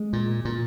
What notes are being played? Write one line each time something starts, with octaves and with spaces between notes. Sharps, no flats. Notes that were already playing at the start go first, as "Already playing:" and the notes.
Already playing: G#3
A#2
A#2